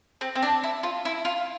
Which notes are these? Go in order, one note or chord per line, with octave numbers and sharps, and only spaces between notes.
C4
C4
D4
E4
F4
E4
F4